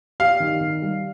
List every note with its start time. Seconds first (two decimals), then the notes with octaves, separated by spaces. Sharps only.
0.20 G4 F5
0.40 D#3
0.61 D#3
0.82 G3